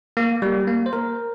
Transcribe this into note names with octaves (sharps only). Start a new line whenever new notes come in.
A#3
G3
A#3
C5
A#4